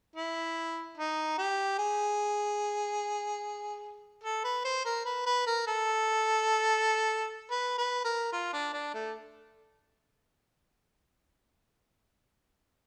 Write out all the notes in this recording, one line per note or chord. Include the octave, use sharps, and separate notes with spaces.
E4
D#4
G4
G#4
A4
B4
C5
A#4
B4
B4
A#4
A4
B4
B4
A#4
F4
D4
D4
A3